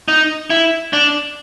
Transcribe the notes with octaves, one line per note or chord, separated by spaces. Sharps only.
D#4
E4
D4